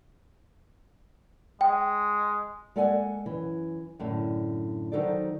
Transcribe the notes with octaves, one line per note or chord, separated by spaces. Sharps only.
G#3 G5
G#3 A#3 A4 D5 F#5 G#5
F#2 E3
F#2 A2 D3
D#3 F#3 D#4 A4 C5 D5